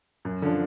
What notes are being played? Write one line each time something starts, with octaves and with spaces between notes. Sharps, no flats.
F#2
D3 F3